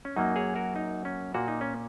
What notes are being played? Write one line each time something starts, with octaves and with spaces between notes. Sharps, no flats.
C#4
F#2 F#3 A#3 D#4
G#4 C#5
F#4 A#4
D#4
C#4
A#2 A#3 F#4
D#4
C#4